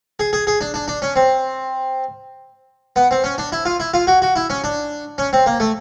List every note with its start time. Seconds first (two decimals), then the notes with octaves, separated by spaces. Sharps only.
0.20 G#4
0.33 G#4
0.47 G#4
0.61 D4
0.74 D4
0.88 D4
1.02 C#4
1.16 C4
2.96 B3
3.11 C4
3.24 C#4
3.38 D4
3.52 E4
3.65 F4
3.80 E4
3.94 F4
4.07 F#4
4.22 F#4
4.36 E4
4.50 C#4
4.64 D4
5.18 C#4
5.33 C4
5.46 A#3
5.60 A3